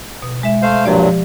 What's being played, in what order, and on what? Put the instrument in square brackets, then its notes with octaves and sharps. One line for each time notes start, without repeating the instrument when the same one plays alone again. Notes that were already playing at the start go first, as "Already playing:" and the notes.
[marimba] B2
G#3 E5
[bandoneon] A3 C5 F5
[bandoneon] G2 A#2 F#3 [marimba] F3 G4 D5